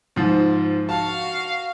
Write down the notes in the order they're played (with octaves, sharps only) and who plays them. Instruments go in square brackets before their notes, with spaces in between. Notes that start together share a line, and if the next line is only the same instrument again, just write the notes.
[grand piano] G#2 F3
[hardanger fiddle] F#4 F5 [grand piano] A5